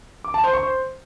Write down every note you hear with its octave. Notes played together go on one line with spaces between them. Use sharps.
D6
A5
C5
C#6
C5